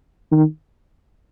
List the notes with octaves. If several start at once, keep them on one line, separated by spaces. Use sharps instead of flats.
D#3